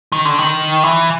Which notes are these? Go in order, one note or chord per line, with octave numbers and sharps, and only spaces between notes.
D#3
D3
D#3
E3